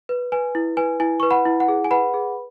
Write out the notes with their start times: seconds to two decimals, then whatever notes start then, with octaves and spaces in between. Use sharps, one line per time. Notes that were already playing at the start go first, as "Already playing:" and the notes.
0.09 B4
0.32 B4 G#5
0.55 E4
0.77 B4 G#5
1.00 E4 G#5
1.20 B4 C#6
1.31 F#5 B5
1.45 E4
1.60 F#5
1.68 G#4
1.84 G#5
1.91 B4 F#5 B5
2.14 G#4